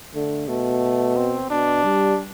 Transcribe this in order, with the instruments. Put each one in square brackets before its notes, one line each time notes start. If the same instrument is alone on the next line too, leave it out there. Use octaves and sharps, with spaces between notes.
[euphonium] D3 [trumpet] A3
[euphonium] B2 [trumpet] A3
[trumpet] C4
[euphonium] B2 [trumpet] D4
[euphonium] G3